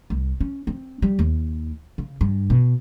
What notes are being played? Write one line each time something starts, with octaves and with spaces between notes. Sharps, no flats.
C2
C#4
C4
G3
D#2
C#3
G2
B2